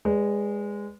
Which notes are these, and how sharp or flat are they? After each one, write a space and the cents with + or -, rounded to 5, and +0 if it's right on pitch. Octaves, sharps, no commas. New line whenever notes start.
G#3 -15 B4 +0 D5 -40